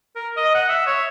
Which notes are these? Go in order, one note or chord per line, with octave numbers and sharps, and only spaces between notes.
A#4
D#5
F#5
E5
C#5